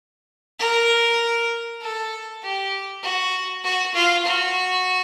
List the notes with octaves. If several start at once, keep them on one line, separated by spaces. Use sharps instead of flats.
A#4
A4
G4
F#4
F#4
F4
F#4